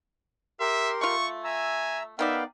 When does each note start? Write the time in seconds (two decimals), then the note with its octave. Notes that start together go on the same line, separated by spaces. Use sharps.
0.60 G4 A#4 E5 C6
1.01 A3 F4 C#6
1.44 E5 G#5 A#5 E6
2.19 D#3 B3 D#4 D5 E5 F5 G5